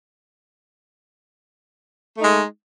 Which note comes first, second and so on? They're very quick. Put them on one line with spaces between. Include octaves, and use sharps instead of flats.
A3 D#4 G#3